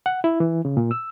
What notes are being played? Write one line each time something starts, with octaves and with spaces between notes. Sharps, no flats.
F#5
E4
E3
C#3
A#2
E6